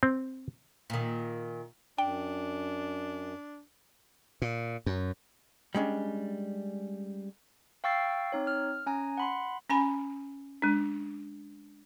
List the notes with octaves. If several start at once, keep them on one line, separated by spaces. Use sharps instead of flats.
C4
A#2 D#3
F#2 D4 G5
A#2
F#2
G3 G#3 C#4 D4
F5 G5 C#6 E6 A6 C7
C4 D#4 C#5
F6
C#4 G#5 A#5
F#5 B5 C6
C#4 G#5 B5
G#3 D4